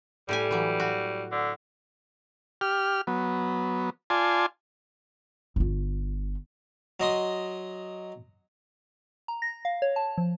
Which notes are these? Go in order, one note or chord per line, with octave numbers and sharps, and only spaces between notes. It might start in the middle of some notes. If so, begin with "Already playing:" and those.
A2 G3 G4 G#5
E3 F#3
F#4
D3
G4 F6
F#3 B3
F4 D5 G#5 A5 C6
G1 F4
F#3 D#5 C6 D#6
A#5
A#6
F5
C#5
A5
F3